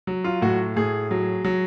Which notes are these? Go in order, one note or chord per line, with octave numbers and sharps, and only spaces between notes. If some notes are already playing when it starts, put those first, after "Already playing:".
F#3
F4
A2 F#4
A2 G#4
F#3
F#3